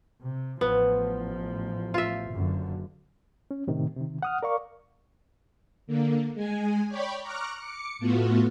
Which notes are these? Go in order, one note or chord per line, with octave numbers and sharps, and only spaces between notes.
C3
A1 F3 B3
F4 E5
F#1 F#2 D3
C#4
A2 C3 D#3
C3 D#3
F#5 D#6 F6
A#4 D5 F5 C#6
D3 A#3
G#3 G#5
C#5 D5 G5 B5 C#6
A#5 C#6 D6 F6 F#6
D6 C#7
A2 A3 B3 F4 F#4